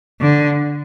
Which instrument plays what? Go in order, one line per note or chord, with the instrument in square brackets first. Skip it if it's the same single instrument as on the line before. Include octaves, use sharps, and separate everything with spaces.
[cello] D3